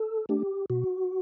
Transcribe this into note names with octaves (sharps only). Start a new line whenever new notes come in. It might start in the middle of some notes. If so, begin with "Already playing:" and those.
Already playing: A4
A3 D4 G4
B2 F#4